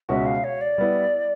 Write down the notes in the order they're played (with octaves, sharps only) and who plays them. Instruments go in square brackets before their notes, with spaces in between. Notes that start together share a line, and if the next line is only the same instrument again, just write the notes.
[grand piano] C#2 B2 G#3 C#4 F#4 [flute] E5
[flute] F5
C#5
D5
[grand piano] G3 B3 E4